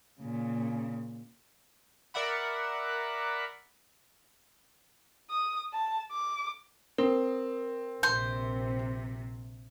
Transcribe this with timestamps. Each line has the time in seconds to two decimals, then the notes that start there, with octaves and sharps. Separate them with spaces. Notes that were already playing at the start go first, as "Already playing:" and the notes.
0.20 A#2 C#3
2.14 A#4 D5 E5 F#5 B5
5.30 D#6
5.73 A5
6.12 D6
6.98 C4 A#4
8.03 A#1 C3 C5